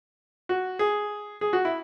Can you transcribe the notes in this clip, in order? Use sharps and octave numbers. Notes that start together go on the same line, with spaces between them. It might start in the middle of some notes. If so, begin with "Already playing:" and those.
F#4
G#4
G#4
F#4
E4